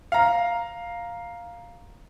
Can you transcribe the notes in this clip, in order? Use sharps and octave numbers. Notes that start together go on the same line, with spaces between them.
F5 A#5